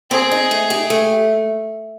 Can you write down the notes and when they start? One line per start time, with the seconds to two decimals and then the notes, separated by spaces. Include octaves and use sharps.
0.11 C4 G#4
0.31 D#4
0.51 A3
0.70 G4
0.90 A3